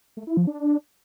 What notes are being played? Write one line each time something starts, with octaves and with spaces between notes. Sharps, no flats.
A3
E4
F3
D4